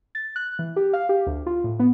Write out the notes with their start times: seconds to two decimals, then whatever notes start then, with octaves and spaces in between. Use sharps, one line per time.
0.15 A6
0.36 F#6
0.59 E3
0.76 G4
0.93 F5
1.09 G4
1.27 D2
1.46 F4
1.64 A2
1.79 B3